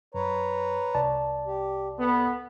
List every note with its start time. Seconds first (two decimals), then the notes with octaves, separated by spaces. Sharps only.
0.14 F#2 B4 C#5 A#5
0.95 C2 D5 A5
1.47 G4
1.99 B3 A4